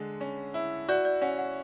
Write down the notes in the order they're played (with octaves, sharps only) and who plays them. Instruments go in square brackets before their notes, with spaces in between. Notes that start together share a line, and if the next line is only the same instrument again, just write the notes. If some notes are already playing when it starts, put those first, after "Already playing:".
Already playing: [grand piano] D3 G#3
C#4
E4
[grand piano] F#4 [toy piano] D5
[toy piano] D5
[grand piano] C#4 [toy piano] F#5
[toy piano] F#5